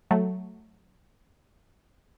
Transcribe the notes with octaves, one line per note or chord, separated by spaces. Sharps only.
F#3 A3